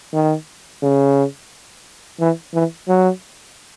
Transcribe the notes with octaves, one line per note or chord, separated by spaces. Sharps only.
D#3
C#3
E3
E3
F#3